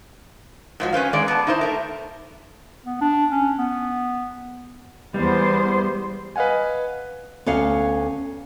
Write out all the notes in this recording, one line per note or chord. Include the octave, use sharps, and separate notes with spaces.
G#2 F3 F#3
C#4 B4 C5 F5
D#3 G#3 D5
B3 A5
D#4 E4 C5
A3 A#4
B3
D4
C#4
B3
E2 G3 B3 C5
B4 D#5 F5 F#5 G#5
D2 B3 C#4 F5